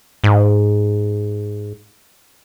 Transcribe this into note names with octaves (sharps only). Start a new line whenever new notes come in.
G#2